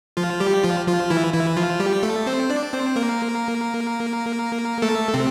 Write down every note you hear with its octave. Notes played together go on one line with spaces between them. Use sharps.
F3 F4
G3 G4
F3 F4
F3 F4
E3 E4
E3 E4
F3 F4
G3 G4
A3 A4
C4 C5
D4 D5
C4 C5
A#3 A#4
A3 A4
C3 C4